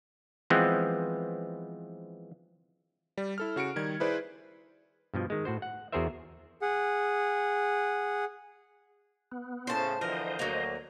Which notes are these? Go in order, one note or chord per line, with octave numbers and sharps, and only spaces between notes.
E3 F3 G#3 B3 C4
G3
E4 A4 F6
C#3 F#4 C#7 D7
D#3 G3 G#6
E4 G#4 B4 C5 D5
G2 B2 F3
D#3 G#3
A2 F#4 C5
F#5
E2 F#4 G#4 A#4 C5 E5
G#4 F#5
B3
A2 C#3 C5 A5
D3 E3 F3 A#4 C5 D#5
D2 F#3 A#3